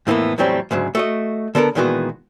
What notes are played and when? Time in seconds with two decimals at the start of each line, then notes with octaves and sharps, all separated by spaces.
0.07 F2 A2 E3 A#3 B3
0.38 E2 A2 F#3 G3 C4
0.71 D2 G#2 C#3 F#3
0.95 A3 F#4 D#5
1.55 D3 B3 A4 A#4
1.75 A#2 D#3 E3 G#3 B3 F#4